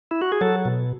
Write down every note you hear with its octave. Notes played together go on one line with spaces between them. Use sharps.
E4
F#4
G#4
F#3 A4
B2